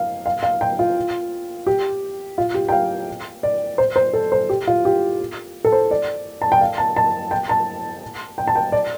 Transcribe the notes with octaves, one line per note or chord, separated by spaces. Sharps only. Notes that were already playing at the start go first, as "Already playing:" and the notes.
Already playing: F5
F5
F5
G5
F4
G4
F4
G4
G5
F5
D5
C5
C5
A4
C5
G4
F4
G4
A4
C5
D5
A5
G5
F5
A5
A5
G5
A5
G5
A5
G5
D5